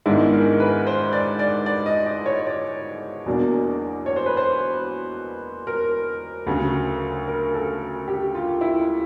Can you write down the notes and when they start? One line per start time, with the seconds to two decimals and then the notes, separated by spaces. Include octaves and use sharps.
0.06 G#2 D#3 G#3 B3 D4 E4
0.33 A#4
0.60 B4
0.87 C5
1.13 D5
1.39 D5
1.66 D5
1.86 D#5
2.06 D5
2.26 C#5
2.47 D5
3.26 E2 B2 F#3 A#3 D4
4.06 C#5
4.16 C5
4.26 B4
4.37 C5
5.67 A#4
6.47 D2 C#3 F#3
7.28 A#4
7.54 A4
8.08 G4
8.35 F4
8.61 E4